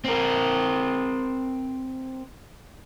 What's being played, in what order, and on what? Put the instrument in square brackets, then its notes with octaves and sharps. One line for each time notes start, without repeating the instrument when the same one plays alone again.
[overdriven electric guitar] C4 A#4